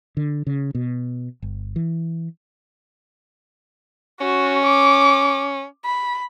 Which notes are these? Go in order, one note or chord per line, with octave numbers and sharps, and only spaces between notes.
D3
C#3
B2
G1
E3
C#4 F#4
D6
B5